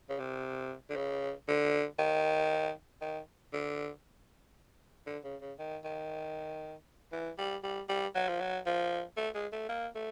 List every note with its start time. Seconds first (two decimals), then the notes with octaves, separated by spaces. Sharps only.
0.09 C#3
0.19 C3
0.90 D3
0.96 C#3
1.48 D3
1.99 D#3
3.01 D#3
3.53 D3
5.06 D3
5.24 C#3
5.41 C#3
5.59 D#3
5.85 D#3
7.12 E3
7.38 G3
7.63 G3
7.89 G3
8.15 F#3
8.29 F3
8.40 F#3
8.66 F3
9.17 A3
9.35 G#3
9.52 A3
9.69 A#3
9.95 A3